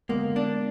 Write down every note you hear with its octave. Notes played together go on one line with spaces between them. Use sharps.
D3 G#3 A#3 B3
D4